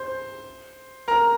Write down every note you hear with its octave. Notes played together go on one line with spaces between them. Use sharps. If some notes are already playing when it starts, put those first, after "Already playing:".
Already playing: C5 C6
A#4 A#5